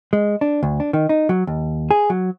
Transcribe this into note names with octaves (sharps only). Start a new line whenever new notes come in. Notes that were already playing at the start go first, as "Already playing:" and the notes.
G#3
D4
D2
D4
D#3
D#4
F#3
D#2
G#4
F#3